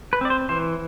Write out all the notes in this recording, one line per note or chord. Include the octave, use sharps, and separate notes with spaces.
B4
C4 D5
C5
E3 C5